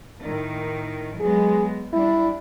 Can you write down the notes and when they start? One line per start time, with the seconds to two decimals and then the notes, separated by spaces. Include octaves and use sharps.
0.25 A2 D#3
1.20 F#3 G#3 B3 G#4
1.93 G3 D4 E4